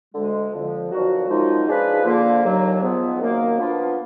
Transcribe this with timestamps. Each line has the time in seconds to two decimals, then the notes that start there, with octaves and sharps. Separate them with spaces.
0.13 D2 D3 G#3
0.52 F2 D3 F3
0.91 F2 D#3 F#3 D4 F#4
1.28 F#2 F3 G#3 D#4
1.67 F3 G#3 D4 G#4 B4
2.04 D3 F3 A#3
2.43 D#2 D3 F#3
2.81 G#2 F3 B3
3.19 F#2 D#3 A#3
3.58 F3 B3 D4 F4